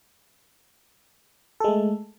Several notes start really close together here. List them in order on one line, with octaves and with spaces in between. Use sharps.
A4 G#3 A3